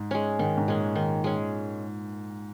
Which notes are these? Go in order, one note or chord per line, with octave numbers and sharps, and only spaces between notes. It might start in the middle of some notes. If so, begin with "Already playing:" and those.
Already playing: G#2
G#3 C#4
G#2 D#3
G#2
A#2 G#3 C#4
D#3
G#3 C#4